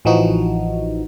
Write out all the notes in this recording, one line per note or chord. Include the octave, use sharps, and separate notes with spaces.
A1 E3 F3 D#4 F#4